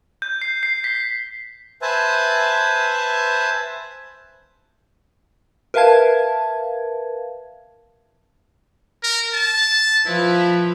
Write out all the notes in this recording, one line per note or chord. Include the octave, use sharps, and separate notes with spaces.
G6
C7
C7
B6
B4 C5 E5 G#5 A5
A#4 B4 E5 F5 A5 G#6
A#4
A5
F3 E4 B4